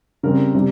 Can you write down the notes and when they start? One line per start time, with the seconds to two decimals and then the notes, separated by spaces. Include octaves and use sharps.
0.23 C#3 G3 C4 A#4
0.55 C3 G3